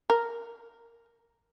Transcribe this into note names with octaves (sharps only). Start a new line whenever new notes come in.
A#4